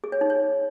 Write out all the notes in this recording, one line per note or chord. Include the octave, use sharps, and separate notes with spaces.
G#4
C#5
D#4
C#5